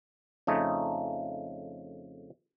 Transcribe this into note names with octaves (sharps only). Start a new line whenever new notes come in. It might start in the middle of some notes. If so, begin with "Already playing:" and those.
F2 C#3 A3 D#4